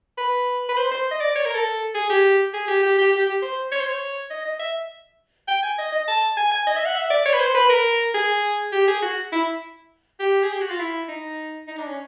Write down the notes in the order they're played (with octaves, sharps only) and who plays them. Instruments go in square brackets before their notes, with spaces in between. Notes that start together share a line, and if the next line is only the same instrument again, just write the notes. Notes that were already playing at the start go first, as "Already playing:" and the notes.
[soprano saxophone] B4
B4
C5
C5
D#5
D5
C#5
A#4
A4
G#4
G4
G#4
G4
G4
G4
G4
G4
C5
C#5
C5
C#5
D#5
D#5
E5
G5
G#5
D#5
D#5
A5
G#5
G#5
D#5
E5
F#5
E5
D5
C#5
B4
C5
B4
A#4
G#4
G4
G#4
F#4
E4
G4
G#4
G4
F#4
F4
E4
D#4
D#4
D4
C#4